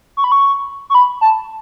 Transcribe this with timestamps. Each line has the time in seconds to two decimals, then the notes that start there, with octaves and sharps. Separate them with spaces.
0.17 C#6
0.24 B5
0.32 C#6
0.90 C#6
0.95 B5
1.21 A5